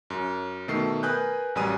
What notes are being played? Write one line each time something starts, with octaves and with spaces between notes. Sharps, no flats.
F#2
B2 D#3 A3 A4 C7
A#4 B4 G#5 D#6 F#6 G6
A1 F#2 G3 G#5 D#6 D#7